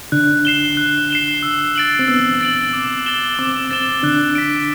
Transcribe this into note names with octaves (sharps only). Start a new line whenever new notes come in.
D3 D4 F#6
C7 E7 G7
F#6
C7 E7 G7
E6
A6 D7 F#7
C4
B3 E6
A6 D7 F#7
D6
A6 E7 G7
C4 D6
C4 A6 E7 G7
D3 D4 F#6
B6 D7